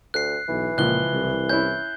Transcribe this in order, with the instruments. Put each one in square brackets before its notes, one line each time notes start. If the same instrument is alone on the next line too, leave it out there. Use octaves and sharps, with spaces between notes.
[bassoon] D2 [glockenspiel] F#6 C7
[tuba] B1 [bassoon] E3
[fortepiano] C#2 F3 [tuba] A#2 [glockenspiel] F#6 G7
[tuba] C2
[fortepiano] C#4 E4 [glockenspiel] G6